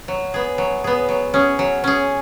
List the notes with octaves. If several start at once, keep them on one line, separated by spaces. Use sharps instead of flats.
F#3
B3 G#4
F#3
B3 G#4
F#3
C#4 G#4
F#3
C#4 G#4